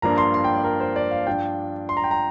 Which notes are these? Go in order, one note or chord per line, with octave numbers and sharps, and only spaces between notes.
G2 F3 A#3 D4 A#5
C6
C6
G5
D5
A#4
C5
D5
F5
G2 F3 D4 G5
C6
A#5
G5
A#5